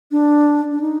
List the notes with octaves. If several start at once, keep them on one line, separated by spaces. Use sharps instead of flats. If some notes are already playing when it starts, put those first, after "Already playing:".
D4
D4
D#4